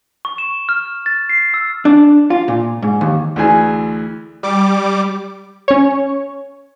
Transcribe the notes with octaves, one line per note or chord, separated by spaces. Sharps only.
C#6
E7
F6
A6
C7
E6
D4
F4
A#2
G#2
D#2
D2 E3 G#4 G#5
G3 D6
C#4 C#5